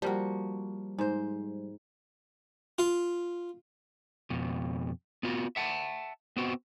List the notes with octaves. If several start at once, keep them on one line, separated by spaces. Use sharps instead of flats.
F3 G3 A#3 F#4
G#2 C5
F4
F2 B2
B3 F4 F#4
E5 F#5 A5
B3 C4 F#4